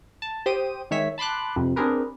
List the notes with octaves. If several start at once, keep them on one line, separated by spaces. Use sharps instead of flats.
A5
G4 C5 G5 D#6 D#7
D#3 G#3 C#5 E5 B6
A5 B5 C6 D6 F#6
F2 C3
C4 D4 G4 G#4 A#4 B4